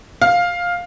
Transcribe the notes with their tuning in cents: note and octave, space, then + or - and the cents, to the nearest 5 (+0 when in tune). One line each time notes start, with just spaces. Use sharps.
F5 +10